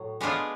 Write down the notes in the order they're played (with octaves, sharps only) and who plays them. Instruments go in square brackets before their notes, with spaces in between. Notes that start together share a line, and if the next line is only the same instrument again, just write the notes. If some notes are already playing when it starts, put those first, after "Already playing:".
Already playing: [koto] A2 F#3
G#3 B3 D4 F4 G#4